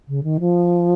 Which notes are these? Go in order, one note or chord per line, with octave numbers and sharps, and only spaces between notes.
C#3
D#3
F3